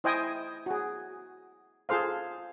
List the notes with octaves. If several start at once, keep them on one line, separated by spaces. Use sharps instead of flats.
E4 C5 D#5 G5 G#5 D#6
F#4 G#4
F4 G#4 A4 C5 F5